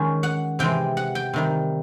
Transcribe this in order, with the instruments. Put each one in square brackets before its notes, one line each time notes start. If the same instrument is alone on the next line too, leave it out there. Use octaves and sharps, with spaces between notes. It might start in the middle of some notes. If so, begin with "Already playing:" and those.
Already playing: [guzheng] D#3 G#3 C#4
F#5
C3 E3 G#3 C4 G5
F#5
G5
C3 D#3 G3